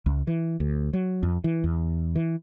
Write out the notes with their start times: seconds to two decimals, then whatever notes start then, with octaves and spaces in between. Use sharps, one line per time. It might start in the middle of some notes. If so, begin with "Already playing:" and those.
0.06 C#2
0.27 E3
0.60 D2
0.93 F#3
1.23 F2
1.44 E3
1.64 E2
2.16 E3